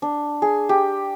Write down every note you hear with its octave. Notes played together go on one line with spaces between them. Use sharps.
D4
G#4
G4